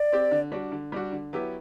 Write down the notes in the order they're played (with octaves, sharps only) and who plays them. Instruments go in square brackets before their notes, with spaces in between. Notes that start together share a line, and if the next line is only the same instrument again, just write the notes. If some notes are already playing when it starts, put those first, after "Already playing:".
Already playing: [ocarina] D5
[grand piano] C4 G4
D3
G3 D4 F#4
D3
G3 D4 F#4
D3
F#3 B3 E4 G4